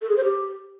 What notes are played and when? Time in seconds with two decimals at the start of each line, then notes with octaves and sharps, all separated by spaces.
0.02 A4
0.09 G#4
0.17 C5
0.24 G4